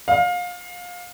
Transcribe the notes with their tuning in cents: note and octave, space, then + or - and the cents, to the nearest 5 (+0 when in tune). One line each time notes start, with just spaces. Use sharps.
F5 +25